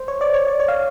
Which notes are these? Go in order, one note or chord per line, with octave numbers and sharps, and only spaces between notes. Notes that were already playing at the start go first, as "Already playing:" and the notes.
Already playing: C5
C#5
D5
C#5
D5
C#5
F5